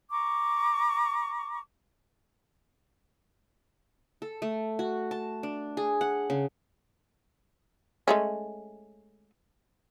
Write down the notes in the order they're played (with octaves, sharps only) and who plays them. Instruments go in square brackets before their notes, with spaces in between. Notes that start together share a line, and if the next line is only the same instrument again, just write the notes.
[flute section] A#5 C#6 D6
[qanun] A4
A3
F#4
A5
D4
G#4
F#5
C#3
[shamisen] G#3 A3 C#4